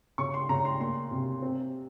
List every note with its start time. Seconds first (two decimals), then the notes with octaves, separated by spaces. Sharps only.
0.18 C#3 C#6
0.34 C6
0.49 C#3 A#5
0.65 C6
0.80 A#3 C6
1.11 C3
1.42 C4